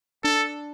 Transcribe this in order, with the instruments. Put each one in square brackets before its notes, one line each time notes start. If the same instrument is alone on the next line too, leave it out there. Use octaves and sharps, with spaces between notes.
[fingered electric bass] D4 [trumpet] A4